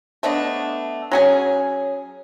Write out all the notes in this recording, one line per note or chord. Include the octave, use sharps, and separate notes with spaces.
A3 B3 D4 D#5
F#3 C#4 G#4